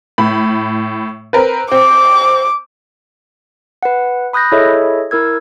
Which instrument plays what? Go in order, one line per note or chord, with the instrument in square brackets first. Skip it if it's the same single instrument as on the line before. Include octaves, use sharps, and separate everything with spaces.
[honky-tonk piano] A2 B5
C4 A#4 B4
[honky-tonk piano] C4 [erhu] D6
[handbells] B4 F#5
B5 D#6 F#6 G6 A#6
E4 G#4 A4 C#5 D#5 E5
E4 A#4 E6 G#6